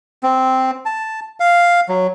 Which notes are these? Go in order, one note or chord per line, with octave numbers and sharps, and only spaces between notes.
C4
A5
F5
F#3